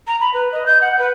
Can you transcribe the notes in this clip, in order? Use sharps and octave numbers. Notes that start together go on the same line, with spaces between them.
A#5
B5
B4
D#5
G6
F#5
B4